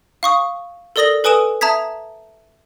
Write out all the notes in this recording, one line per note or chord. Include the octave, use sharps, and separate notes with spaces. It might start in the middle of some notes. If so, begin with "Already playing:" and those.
F5 C#6 D#6
A4 A#4 D5 D#6 A#6 F#7
A4 B4 G#5 D#6 D7 E7
E5 A5 A#5 D#6 G#6 B6